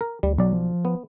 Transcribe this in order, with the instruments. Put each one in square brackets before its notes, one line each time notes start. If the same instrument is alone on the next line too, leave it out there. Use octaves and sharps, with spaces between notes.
[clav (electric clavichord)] A#4
[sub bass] D2 [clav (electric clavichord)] G3
[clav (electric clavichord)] B1 D5 [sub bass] F#3
[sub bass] F3
[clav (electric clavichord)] B3